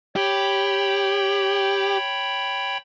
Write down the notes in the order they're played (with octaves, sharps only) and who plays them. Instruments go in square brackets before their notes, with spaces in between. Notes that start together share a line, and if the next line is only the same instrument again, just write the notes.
[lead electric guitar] G4 [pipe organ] C#5 G5 B5